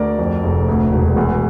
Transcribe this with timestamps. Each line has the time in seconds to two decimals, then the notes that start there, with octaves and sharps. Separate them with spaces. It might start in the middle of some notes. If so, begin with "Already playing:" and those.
Already playing: D2 A#4 D5
0.19 F2
0.43 F1
0.68 D2
0.92 E1
1.16 E2